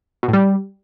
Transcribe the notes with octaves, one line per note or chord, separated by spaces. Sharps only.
B2
A2
G3